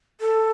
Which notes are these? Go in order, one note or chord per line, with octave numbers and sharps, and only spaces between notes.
A4